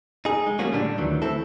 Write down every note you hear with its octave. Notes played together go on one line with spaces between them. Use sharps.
D#4 G#4
G#3
G3 A3 A#3 C#4 F4 F#4
A2 D3 G3 D4
D2 D#3 E3 F#3
A3 C4 E4 A4